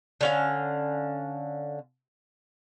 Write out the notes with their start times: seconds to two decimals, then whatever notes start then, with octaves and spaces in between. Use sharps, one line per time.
0.21 D3 C#4 F5